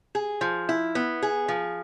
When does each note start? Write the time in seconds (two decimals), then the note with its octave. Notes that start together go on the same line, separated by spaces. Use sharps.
0.15 G#4
0.41 F3
0.69 E4
0.95 B3
1.22 G#4
1.48 F3